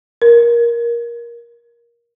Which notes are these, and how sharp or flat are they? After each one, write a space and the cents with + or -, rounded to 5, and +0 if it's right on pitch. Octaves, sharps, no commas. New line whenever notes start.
A#4 +15